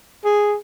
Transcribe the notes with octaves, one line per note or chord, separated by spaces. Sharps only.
G#4